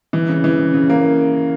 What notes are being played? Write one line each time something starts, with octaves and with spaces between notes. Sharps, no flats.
E3
C#3
E3
C#3
C#3
A#3